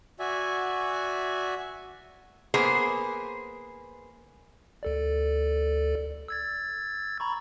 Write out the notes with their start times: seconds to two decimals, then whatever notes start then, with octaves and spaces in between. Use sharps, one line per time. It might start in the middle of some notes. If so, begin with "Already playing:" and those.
0.19 F#4 D5 E5 G#5
2.54 A#3 B3 G#4 C5
4.83 D2 A4 D5
6.28 E6 G#6 A6
7.20 A#5 B5 C#6